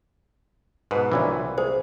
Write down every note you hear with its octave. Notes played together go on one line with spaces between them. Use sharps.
G#2 B2 B4
C2 A#2 D#3 E3 F#3 D4
G#4 C5